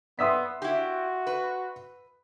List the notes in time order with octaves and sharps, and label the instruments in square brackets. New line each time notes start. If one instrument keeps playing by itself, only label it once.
[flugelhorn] B3 [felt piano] D5 E5 C6 [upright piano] D#6 E6 B6
[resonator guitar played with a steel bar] E4 G4 [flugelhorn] F#4
[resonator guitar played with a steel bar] B4